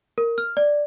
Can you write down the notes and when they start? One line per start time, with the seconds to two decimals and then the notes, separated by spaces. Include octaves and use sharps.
0.18 A#4
0.38 F6
0.57 D5